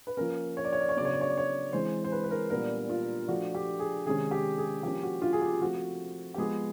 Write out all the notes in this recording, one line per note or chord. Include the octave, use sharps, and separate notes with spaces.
B4
F3 A#3 C#4 A#4
C#5
D5
C#5
D5
C#5
C#3 F#3 B3 D4 D5
C#5
D5
C#5
D5
C#5
E3 G#3 C4 C5
C5
B4
B4
A#4
A#2 G3 B3 D4 A#4
F4
F3 A3 D4 F#4
G4
G#4
C3 D#3 G#3 C#4 G#4
G4
G#4
F3 A#3 C#4 G4
F#4
F4
G#4
G4
F3 A3 C4 F#4
G4
F3 G#3 B3 G#4